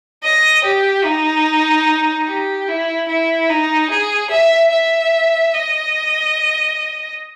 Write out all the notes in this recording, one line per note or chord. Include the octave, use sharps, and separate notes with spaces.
D#5
G4
D#4
G4
E4
E4
D#4
G#4
E5
E5
D#5